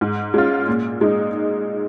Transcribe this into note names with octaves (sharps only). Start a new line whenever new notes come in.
G#2
G#3 C#4 F4
A#2
G#3 D#4